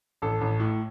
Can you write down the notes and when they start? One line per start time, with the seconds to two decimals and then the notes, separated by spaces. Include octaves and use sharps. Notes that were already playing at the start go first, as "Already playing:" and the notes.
0.22 A1 A4
0.41 A1
0.60 A2